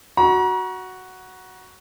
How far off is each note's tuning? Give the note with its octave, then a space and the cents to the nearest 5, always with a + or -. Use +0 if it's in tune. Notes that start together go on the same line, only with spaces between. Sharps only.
F#4 +0 A#5 +35